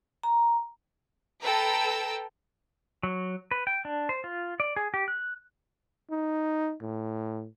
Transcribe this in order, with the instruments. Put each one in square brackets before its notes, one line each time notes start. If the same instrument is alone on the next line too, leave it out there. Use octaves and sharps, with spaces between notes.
[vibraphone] A#5
[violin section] A4 B4 G5 A#5 E6
[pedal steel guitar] F#3
B4
G5
D4
C5
F4
D5
G#4
G4
F#6
[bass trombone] D#4
A2